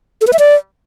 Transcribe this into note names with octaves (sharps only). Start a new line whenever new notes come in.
A4
B4
E5
D5